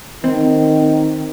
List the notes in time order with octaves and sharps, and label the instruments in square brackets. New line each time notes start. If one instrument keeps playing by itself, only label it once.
[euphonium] D#3 [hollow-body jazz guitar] C4